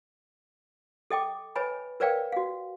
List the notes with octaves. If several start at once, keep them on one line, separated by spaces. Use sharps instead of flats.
A4 D#5 G5 D6
B4 C#5 D#5 G#5 B5
A#4 B4 C#5 D5 F5 G5
F#4 F5